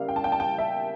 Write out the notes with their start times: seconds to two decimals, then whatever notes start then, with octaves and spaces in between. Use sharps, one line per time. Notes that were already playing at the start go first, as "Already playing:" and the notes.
Already playing: C#3 G3 A#3 E4 F5
0.09 G5
0.16 A5
0.24 G5
0.32 A5
0.40 G5
0.58 E5